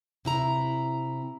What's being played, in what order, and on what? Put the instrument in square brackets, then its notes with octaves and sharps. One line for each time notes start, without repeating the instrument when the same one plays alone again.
[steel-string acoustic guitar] C3 E4 A#5